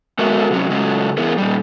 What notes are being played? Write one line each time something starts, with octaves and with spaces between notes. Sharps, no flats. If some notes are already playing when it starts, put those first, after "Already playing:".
G#3 B3 F#4 A4 A#4 E5
C3 F#3 C#4
C#3 F#3 G#3 A3 C#4
E3 B3 E4 G#4 A#4
A#2 G3